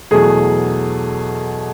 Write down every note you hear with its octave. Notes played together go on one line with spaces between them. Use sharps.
E2 B2 F#3 A3 G#4